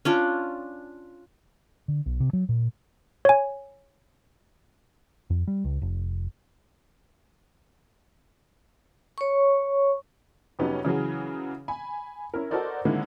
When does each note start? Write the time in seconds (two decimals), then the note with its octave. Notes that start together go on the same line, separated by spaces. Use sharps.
0.05 C#4 D4 F4 D5
1.88 D3
2.06 B1
2.20 C3
2.33 F#3
2.49 A#2
3.25 C#5 G#5
5.30 F2
5.48 G3
5.65 C#2
5.82 F1
9.18 C#5 C#6
10.59 F2 C3 F#3 B3 C#4 D#4
10.85 C#3 E3 F#3 G#4
11.68 G#5 B5
12.34 C#4 E4 A#4
12.51 F#4 A4 A#4 C5 D5 D#5
12.85 D3 D#3 G#3 A#3 C4 E4